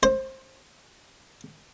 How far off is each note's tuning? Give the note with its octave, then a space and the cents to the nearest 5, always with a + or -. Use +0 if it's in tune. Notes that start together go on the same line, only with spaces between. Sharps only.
C5 +20